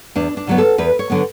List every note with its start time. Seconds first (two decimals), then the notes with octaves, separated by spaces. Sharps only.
0.15 E2 D4
0.37 D4
0.47 D3 F#3 B3
0.58 A4
0.78 E2 B4
0.99 C#5
1.10 D3 F#3 B3